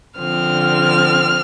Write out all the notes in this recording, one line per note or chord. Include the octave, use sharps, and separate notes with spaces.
D3 F3 C4 F6